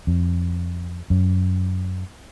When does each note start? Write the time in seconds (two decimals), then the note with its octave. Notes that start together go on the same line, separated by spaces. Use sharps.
0.07 F2
1.10 F#2